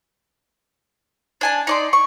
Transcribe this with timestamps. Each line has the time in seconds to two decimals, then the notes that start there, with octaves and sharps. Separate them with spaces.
1.41 D4 G#5 A5
1.67 D#4 D5 C6
1.93 C#6